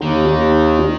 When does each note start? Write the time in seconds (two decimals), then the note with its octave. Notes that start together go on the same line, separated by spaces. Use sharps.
0.01 D#2 D#3
0.28 D#2